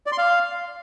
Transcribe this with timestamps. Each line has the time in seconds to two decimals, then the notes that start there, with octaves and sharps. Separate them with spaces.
0.06 D5
0.12 C6
0.18 F5